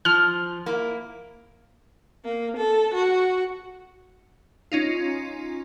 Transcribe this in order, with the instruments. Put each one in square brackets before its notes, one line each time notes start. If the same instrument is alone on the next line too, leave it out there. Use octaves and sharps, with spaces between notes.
[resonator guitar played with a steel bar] F3 [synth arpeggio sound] F6
[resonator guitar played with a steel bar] A#3 E4
[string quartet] A#3
A4
F#4
[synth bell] C#4 D#4 F4